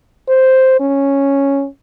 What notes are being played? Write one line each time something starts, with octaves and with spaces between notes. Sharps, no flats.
C5
C#4